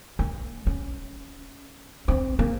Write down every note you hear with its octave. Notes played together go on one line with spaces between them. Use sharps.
A#3
C#4
C4
A#3